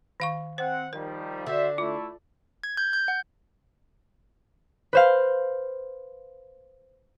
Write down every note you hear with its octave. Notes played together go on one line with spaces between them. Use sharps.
D#3 F5 C#6
C4 C5 F#5
D#3 F3 G3 A#4
D3 F#4 C5 E5
A3 E4 F4
G#6
G6
G6
F#5
B4 C5 F5